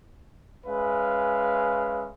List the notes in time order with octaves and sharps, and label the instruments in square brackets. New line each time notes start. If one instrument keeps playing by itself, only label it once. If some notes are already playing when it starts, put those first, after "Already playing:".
[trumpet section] G#3 C#4 B4 E5 F5